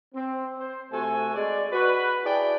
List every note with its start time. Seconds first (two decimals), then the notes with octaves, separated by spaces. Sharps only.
0.15 C4
0.59 C5
0.92 C3 A3 F#4 A4 G#5
1.35 G#3 D5
1.72 F#4 B4
2.25 E4 G#4 D5 G5 A5 B5